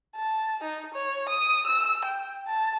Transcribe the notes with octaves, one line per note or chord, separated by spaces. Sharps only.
A5
D#4
C#5
D#6
E6
G5
A5